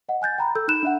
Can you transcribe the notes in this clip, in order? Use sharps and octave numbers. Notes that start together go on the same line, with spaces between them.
D#5 F#5
G#5 F#6 G6 A6
G5 A#5 B5
A4 E6 G6
D#4 B5 F#6 E7
D4 E5 F#5